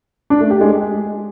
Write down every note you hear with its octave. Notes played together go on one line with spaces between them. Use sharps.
D4
A3
G4
G#3
G#3